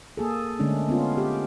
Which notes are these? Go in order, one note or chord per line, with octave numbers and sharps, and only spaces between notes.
A#3 G#4 A4
D3 G#3 A3 C#4 D4
B3 C#4 F4
G4